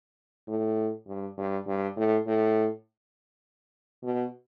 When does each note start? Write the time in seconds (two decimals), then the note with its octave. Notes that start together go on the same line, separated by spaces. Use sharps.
0.48 A2
1.07 G2
1.37 G2
1.67 G2
1.96 A2
2.26 A2
4.03 B2